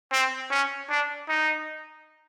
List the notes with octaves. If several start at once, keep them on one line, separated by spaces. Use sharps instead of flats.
C4
C#4
D4
D#4